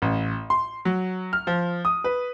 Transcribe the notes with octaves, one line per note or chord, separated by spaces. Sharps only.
A1
C6
F#3
F6
F3
D#6
B4